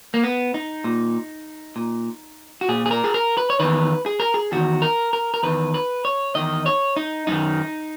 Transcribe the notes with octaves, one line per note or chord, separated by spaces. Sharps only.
A#3
B3
D#4
A#2
A#2
F#4
A#2 G#4
G#4
A#4
G#4
A#4
B4
C#5
E2 D#3 B4
G#4
A#4
G#4
E2 D#3 F#4
A#4
A#4
A#4
E2 D#3 B4
B4
C#5
E2 D#3 D#5
C#5
D#4
F#2 D#3 D#4